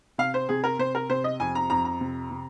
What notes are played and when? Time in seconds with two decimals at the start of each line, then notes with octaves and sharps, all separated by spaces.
0.18 C3 F5
0.34 C5
0.49 C3 G#4
0.64 A#4
0.79 C3 C5
0.95 A#4
1.09 C3 C5
1.24 D#5
1.40 F2 G#5
1.55 A#5
1.70 F2 A#5
1.85 A#5
2.01 C3
2.31 C3